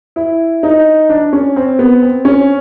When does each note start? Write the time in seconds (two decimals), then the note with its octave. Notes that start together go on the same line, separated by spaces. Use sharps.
0.16 E4
0.63 D#4
1.09 D4
1.33 C#4
1.56 C4
1.79 B3
2.02 C4
2.25 C#4